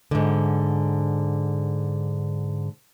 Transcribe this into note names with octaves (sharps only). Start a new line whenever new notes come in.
G#2 D3